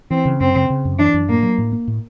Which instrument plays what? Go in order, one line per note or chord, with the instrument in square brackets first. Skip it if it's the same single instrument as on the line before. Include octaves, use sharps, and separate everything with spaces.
[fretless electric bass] E3 [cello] C4
[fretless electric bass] C#3
[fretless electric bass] F#2 [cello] C4
[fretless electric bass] C#3
C#3
F#2
[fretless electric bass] E3 [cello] D4
[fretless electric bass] F#2
[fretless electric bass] A2 [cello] A#3
[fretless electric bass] F#3
A2
A#3
A2